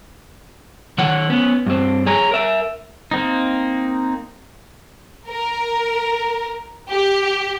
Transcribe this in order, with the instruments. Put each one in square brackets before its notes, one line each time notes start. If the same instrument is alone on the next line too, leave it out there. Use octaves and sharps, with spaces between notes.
[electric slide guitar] D#3 C#5 F#5
B3 C#4
G2 C4
G#4 C#5 A#5
A#4 E5
[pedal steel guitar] A#3 C4 D#4
[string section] A#4
G4